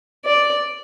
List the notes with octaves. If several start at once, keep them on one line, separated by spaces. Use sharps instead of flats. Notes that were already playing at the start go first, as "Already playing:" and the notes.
D5